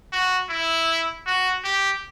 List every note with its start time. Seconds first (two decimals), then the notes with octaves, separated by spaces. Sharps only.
0.13 F#4
0.49 E4
1.26 F#4
1.64 G4